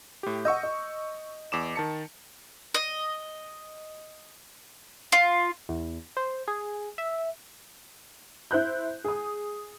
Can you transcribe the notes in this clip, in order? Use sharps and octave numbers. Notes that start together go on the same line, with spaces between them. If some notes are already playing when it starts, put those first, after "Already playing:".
A2 G4
D#5 F#5 C#6 E6 G6
D#5
E2 D6 E7
D#3 A5 C#7
D#5
F4
E2
C5
G#4
E5
E4 C5 F#6 G6
G#4 D#6